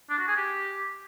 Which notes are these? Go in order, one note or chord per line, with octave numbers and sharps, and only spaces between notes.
D4
F#4
G#4
G4